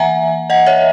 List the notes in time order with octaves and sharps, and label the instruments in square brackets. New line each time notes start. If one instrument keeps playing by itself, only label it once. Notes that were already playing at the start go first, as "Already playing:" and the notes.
Already playing: [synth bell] E3 A#3 E5 F#5 G#5 A#5
D#5 F#5
C#5 E5